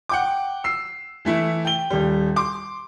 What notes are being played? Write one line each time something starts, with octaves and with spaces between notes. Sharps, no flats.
F#5 G5 D6
E6 C7
E3 A3 E4
G5 G7
D#1 G3
C6 D6